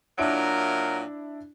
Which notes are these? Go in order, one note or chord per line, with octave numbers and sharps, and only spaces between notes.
A#2 F#3 D4 E4 A#4 D7